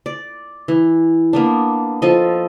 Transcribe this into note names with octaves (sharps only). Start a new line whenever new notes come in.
D5
E3
A#3 B3 D4
F3 A4 D#5